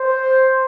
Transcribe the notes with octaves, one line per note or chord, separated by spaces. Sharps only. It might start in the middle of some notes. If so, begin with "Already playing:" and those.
Already playing: C5